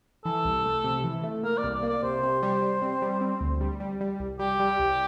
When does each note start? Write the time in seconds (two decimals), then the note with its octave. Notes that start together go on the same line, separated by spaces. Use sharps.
0.25 E3 A4
0.45 C2
0.65 A3
0.84 C3
1.04 E3
1.23 A3
1.43 A#3 A#4
1.58 D5
1.63 C2
1.74 D5
1.83 A#3
1.89 D5
2.03 C3 C5
2.23 C3
2.42 G3
2.62 G3
2.82 C4
3.02 G3
3.21 C4
3.41 D2
3.61 G3
3.80 G3
4.00 G3
4.20 C2
4.39 G3 G4
4.60 G3
4.79 C2